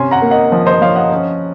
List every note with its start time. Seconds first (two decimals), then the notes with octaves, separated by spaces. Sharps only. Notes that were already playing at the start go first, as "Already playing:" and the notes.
Already playing: C3 C#4 G#5 C6
0.11 F#5 A#5
0.22 A#3
0.31 D#5 F#5
0.52 F3
0.66 C5 D#5
0.82 F3 C#5 F5
0.96 D#5 F#5
1.12 C#4